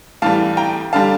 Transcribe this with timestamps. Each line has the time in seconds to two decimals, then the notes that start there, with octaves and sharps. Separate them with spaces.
0.22 A2 E3 G3 F5 A5
0.57 G5 A#5
0.93 D3 G3 F5 A5